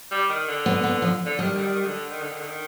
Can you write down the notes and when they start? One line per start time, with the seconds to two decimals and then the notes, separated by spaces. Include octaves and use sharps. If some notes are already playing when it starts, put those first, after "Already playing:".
0.11 G3
0.30 D#3
0.48 D3
0.66 B3
0.84 B3
1.02 F3
1.26 D3
1.39 D#3 G3
1.57 D3
1.62 D#3
1.76 D#3
1.86 D3
2.10 D#3
2.21 D3
2.32 D#3
2.40 D3
2.47 D#3